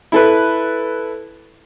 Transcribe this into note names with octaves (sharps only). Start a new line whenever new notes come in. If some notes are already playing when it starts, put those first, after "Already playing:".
E4 A4 B4